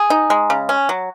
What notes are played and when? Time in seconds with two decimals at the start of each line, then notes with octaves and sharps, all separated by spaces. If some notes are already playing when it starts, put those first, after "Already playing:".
Already playing: G#4
0.10 D#4
0.30 G#3
0.50 C#3
0.69 C#4
0.89 F#3